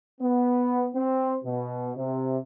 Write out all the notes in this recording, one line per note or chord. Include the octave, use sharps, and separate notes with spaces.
B3
C4
B2
C3